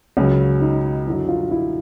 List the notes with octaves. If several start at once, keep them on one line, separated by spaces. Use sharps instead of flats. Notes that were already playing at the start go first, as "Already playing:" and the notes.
C#2 C#3 F#3 C#4
D#4
F#2 D3 F#3 E4
F4
E4